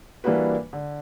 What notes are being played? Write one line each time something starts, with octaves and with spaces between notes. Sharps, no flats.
E3 G3 A#3 D4 F#4 B4
D3